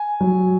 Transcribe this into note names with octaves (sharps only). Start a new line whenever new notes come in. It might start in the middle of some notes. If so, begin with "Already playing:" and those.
Already playing: G#5
F#3